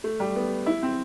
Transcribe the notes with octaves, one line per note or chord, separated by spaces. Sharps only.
A3
G3
B3
E4
C4